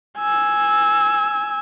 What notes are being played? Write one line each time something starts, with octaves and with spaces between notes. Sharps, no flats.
G#5 E6